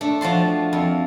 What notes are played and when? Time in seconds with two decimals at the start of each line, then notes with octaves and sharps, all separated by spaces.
0.01 A3 D4
0.21 F3 F#4 A5 C6
0.73 F2